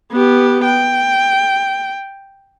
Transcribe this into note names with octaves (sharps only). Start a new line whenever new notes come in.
B3 G4
G5